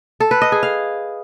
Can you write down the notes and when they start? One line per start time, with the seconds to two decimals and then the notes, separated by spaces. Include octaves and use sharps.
0.20 A4
0.31 B4
0.42 D#5
0.52 G#4
0.63 F5